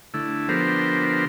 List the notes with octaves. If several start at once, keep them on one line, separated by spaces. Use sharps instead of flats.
D3 A3 E4
D3 F3 B3 G4 A#4 C5